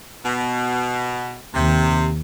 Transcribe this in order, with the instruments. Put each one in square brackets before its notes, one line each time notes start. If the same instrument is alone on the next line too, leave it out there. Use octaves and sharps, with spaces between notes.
[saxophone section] B2
[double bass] D#2 [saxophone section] C3